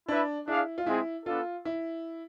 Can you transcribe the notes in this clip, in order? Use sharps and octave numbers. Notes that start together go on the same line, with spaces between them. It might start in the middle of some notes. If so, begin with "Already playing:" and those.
D4 E4 B4 E5
D4 E4 G#4 D5 F5
F4
G#3 C4 E4 G#4
B3 D4 F4 A4
E4